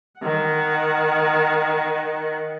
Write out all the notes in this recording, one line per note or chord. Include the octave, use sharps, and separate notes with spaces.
D#3 F#5